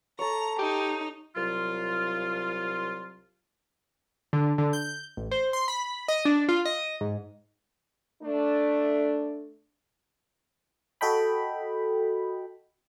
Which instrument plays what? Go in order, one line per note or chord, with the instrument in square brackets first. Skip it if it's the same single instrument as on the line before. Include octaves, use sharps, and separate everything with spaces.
[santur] A4 C#5 [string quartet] A#5
[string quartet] D#4 [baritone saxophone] G4
[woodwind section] C2 F#3 F4
[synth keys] D3
D3
G6
A1
C5
C6
B5
D#5
D4
F4
D#5
G#2
[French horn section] A3 D4
[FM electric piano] F#4 A4 D#5 G5 B5